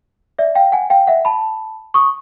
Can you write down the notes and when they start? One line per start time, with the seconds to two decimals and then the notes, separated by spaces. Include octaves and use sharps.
0.39 D5 E5
0.55 F5 G5
0.72 F#5 G#5
0.90 F5 G5
1.07 E5 F#5
1.25 A5 B5
1.94 C#6 D#6